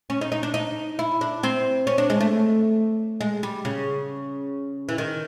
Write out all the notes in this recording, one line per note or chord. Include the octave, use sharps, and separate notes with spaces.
C#4
D#4
D#4
D4
D#4
E4
D4
C4
C#4
D4
G#3
A3
G#3
G3
C#3
E3
D#3